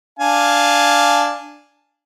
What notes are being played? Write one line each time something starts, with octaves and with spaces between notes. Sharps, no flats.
D4 F5 G#5